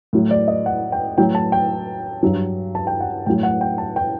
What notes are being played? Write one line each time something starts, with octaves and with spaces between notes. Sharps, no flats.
A2 F#3
D5
D#5
F#5
G5
A2 F#3 G5
A5
G5
G2 F#3
A5
G5
F#5
A2 F#3 G5
F#5
G5
A5
G5